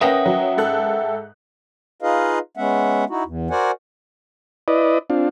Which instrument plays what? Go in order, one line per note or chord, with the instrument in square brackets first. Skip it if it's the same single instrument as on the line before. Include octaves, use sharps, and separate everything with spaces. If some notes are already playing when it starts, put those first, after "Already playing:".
[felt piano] C#4 A#4 B4 [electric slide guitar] E5 F#5 G5 [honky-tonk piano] D#6 A#6
[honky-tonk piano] F#3
G#2 A4 F#6
[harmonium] D#4 F4 G#4 B4 D#5 F5
G#3 B3 C#4 E5 F#5
D#4 E4 F#4
E2
F#4 A#4 C5 D5 F#5 G#5
[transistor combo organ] E4 B4 D5 D#5
C4 D4 F4